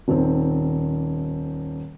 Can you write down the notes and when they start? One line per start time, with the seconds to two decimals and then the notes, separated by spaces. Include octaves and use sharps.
0.08 D#1 D#3 C4